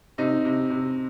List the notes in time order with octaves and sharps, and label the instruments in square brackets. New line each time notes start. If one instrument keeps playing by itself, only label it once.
[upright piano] C3 D#4
C3
C3